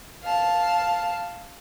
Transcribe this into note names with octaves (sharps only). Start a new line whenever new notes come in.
F5 A5